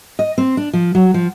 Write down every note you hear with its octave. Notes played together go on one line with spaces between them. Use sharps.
D#5
C4
D4
F3
F#3
F3